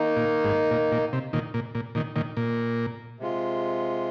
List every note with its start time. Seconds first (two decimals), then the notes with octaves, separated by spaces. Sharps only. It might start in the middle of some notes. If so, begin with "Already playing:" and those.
Already playing: D#3 A#3 D#4
0.16 A#2
0.44 G#2
0.71 A#2
0.92 A#2
1.13 C3
1.33 A#2 D#3
1.54 A#2
1.75 A#2
1.95 A#2 D#3
2.16 A#2 D#3
2.37 A#2
3.20 C3 G#3 F4